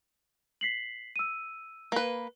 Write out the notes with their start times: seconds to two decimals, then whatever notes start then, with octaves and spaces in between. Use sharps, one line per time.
0.61 B6 C7 F#7
1.16 E6 D#7
1.92 A#3 B4